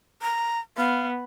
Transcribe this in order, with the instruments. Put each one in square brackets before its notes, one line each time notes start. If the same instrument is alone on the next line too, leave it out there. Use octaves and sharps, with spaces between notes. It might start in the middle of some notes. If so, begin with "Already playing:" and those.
[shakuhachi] A#5
[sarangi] B3 [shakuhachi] F5